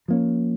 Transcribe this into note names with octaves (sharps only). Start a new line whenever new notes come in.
F3 A#3 C#4